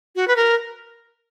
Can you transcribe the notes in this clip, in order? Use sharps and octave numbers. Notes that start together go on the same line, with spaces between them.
F#4
B4
A#4